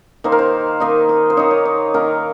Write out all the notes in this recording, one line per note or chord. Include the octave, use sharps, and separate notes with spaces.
D#3 A#3 D#4 C5
A#4
C5
D#3 A#3 D#4 D#5
D#5
C5
D#3 A#3 D#4 C#5
C#5
C#5
D#3 A#3 D#4 A#4